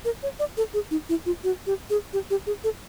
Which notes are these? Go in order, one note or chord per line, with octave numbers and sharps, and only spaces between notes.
A#4
C#5
D5
A4
G#4
D#4
E4
F4
F#4
G4
G#4
G4
G4
G#4
A4